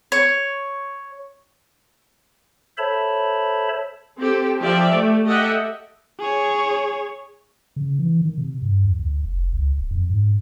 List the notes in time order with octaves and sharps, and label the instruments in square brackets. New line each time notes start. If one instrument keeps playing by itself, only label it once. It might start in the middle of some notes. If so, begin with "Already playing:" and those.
[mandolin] C#5
[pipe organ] A4 C5 C#5 E5 A5 B5
[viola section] C4 G4 A4
F3 G4 D5 E5
A3
G4 A4 D#5 E5 F#5 G5
[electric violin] G#4 C#5
[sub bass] C#3
E3
D#3
C3
G2
E2
D2
F1
C#2
D1
F2
G#2